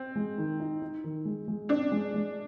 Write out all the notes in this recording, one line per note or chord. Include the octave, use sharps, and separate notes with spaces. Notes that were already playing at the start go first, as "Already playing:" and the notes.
Already playing: C4
G#3
D#3
D#4
D#4
D#3
G#3
G#3
C4 D4
G#3
G#3